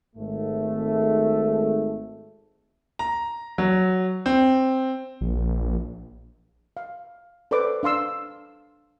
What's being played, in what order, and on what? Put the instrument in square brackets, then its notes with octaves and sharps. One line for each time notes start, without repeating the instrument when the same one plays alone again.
[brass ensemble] G#1 G#2 A3
[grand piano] A#5
F#3
C4
[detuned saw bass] A#1
[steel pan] F5
A4 B4 C5 D5 D6
D4 F5 C6 E6